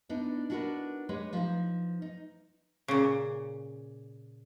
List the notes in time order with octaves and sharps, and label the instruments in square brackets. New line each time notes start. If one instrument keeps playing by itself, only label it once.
[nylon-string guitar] B3 D4 D#4
D4 D#4 F#4 G#4 A#4 B4
G#3 G4 B4 C#5
F3 D#4
D#4
[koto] A#2 C#3